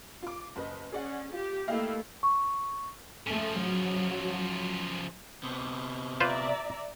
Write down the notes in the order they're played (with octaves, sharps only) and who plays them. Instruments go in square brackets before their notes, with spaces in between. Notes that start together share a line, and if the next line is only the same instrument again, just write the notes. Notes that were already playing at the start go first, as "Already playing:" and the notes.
[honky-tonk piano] F4 D6
F#1 B4 D#5
[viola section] C#4 [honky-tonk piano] G#4 D5 F#5
[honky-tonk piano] F4 [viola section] G4
[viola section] A3 A#3 E4 [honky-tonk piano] G4 D#5 F5
[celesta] C#6
[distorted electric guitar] C#3 F3 [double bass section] A3
[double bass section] F#3
[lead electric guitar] C3 B3
[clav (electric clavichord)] F4 B4 C5 [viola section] D5 E5 A#5